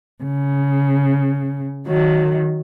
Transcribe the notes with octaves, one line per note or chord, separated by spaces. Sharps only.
C#3
D#3 F#3